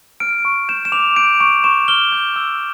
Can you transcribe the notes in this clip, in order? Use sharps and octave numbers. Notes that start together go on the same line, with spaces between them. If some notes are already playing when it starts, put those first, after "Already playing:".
F6 D7
C#6
G6 E7
E7
D6 F7
G6 D7
C#6 D7
C#6 E7
F6 G7
G6
E6